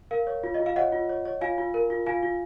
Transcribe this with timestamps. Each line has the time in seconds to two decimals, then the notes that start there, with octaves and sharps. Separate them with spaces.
0.11 A#4 F5
0.27 C#5
0.43 F4
0.54 D#5
0.59 F4
0.66 F5
0.76 C#5 D#5 F#5
0.92 F4
1.09 C#5
1.25 C#5
1.41 F4 F5 G#5
1.58 F4
1.74 A#4
1.90 F4
2.06 F4 F5 G#5
2.23 F4